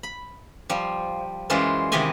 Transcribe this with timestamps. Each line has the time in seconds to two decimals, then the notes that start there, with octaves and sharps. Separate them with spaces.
0.03 B5
0.70 F3 G3
1.50 F#2 E3 G#3 F4 C5 D5
1.92 C3 D#3 E3 G4 D#5 G#5